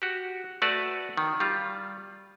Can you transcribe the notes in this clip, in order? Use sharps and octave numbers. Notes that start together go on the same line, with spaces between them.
F#4 G4
A3 F#4 B4 D5 A5
D#3
G3 F4